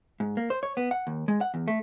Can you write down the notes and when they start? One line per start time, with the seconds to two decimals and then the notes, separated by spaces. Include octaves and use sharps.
0.20 G#2
0.37 A#3
0.50 C5
0.63 C#5
0.77 B3
0.91 F#5
1.07 D#2
1.28 G#3
1.41 F#5
1.54 E2
1.68 A3